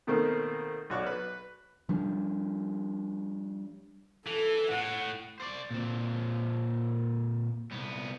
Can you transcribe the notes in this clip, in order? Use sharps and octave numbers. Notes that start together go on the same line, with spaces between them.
B2 D#3 A3 A#3 C4
B1 F#4 C#5 D5
B4
F3 G3 D4
E3 A4
A2 F#5
C5 D5
A#2 C4
C2 B3